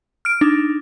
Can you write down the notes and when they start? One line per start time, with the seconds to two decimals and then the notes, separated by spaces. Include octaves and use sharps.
0.25 F6 D7
0.41 D4 D#4